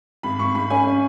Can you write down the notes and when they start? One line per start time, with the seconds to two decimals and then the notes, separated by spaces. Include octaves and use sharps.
0.23 G#1 B5
0.39 G#1 C#6
0.55 G#2 B5
0.70 C#4 G#5
0.86 C#4